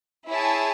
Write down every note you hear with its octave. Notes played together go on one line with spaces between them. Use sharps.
E4 G#4 C#5 E5 A5